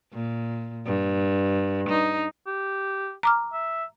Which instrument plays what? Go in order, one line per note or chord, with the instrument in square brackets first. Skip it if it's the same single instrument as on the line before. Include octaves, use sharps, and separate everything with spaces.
[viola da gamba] A#2
G2
D#4
[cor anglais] G4
[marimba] A#5 D6 F6
[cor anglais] E5